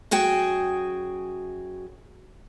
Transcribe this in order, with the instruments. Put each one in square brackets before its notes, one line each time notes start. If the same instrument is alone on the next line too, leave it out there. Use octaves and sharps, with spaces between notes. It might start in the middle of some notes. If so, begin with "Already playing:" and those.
[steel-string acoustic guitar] F#2 F#4 G#4 G5